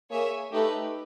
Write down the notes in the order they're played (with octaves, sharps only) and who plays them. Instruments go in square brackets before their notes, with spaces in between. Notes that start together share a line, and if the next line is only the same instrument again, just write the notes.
[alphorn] A#3 [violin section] G#4 C#5 E5 G#5
[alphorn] A3 [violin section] D#4 G4 B4